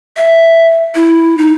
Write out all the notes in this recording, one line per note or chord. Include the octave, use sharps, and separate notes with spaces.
E5
E4
D#4